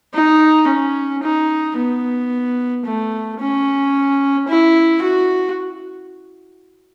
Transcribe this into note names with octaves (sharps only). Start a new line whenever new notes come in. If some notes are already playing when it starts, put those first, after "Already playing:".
D#4
C#4
D#4
B3
A3
C#4
E4
F#4